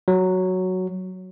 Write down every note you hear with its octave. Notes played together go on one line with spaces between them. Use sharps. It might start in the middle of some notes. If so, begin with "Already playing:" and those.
F#3